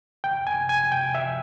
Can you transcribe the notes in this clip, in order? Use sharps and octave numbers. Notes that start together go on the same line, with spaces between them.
G5
G#5
G#5
G5
E5